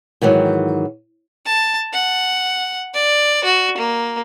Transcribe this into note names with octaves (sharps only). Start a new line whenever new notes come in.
G#2 D#3 E3 F#3
A5
F#5
D5
F#4
A#3